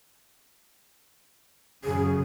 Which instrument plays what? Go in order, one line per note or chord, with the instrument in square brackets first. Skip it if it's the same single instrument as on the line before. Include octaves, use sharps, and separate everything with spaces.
[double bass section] F#2 C#3 [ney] G#4